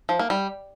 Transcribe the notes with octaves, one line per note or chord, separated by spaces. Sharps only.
F3
A#3
G3